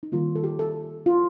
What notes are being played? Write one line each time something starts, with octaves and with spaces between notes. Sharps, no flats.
D#4
D#3 G3 A#3 F4
A4
G4
A4
F4